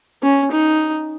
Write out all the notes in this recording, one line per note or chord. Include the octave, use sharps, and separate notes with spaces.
C#4
D#4